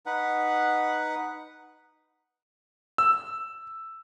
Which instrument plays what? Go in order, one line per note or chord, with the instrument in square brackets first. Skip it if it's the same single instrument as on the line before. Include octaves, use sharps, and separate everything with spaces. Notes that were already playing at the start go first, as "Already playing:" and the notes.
[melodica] D#4 B4 F#5
[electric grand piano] E6